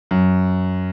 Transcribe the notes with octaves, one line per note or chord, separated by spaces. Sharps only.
F#2